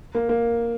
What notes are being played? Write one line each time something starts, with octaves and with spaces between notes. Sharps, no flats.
A#3
A#3